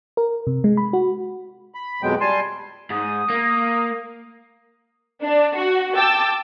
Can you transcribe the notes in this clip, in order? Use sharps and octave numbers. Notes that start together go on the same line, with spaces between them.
A#4
C3
G#3
B5
F#4
B5
F2 B2 F#3 G#3 B3 G5
G3 G#5 A5 C6
G#2 D#6
A#3
D4
F#4
G5 A5 D6 E6 A6